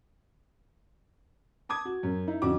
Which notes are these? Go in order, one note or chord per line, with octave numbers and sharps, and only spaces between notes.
A5 D6 D#6 G#6
F#4
F#2
D#4 E4
F2 D3 C#4 F#4 D6